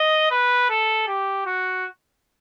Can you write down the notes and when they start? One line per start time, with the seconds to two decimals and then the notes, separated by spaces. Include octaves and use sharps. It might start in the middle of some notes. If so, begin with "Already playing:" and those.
Already playing: D#5
0.31 B4
0.70 A4
1.08 G4
1.46 F#4